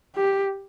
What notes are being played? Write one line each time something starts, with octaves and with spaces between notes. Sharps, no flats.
G4